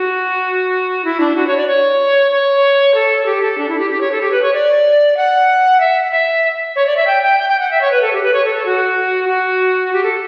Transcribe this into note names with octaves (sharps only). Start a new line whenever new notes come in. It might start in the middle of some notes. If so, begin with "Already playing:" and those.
Already playing: F#4
E4
D4
F#4
C#5
D5
C#5
C#5
A4
G4
A4
D4
E4
G4
G4
C#5
A4
G4
B4
C#5
D5
F#5
E5
E5
C#5
D5
E5
G5
G5
G5
G5
F#5
E5
C#5
B4
A4
G4
B4
C#5
A4
A4
F#4
F#4
G4
A4